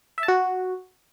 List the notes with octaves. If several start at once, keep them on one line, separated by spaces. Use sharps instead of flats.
E5
A5
F#4